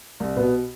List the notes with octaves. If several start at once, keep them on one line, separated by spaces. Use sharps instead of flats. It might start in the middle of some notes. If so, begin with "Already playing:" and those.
C2
B2 B3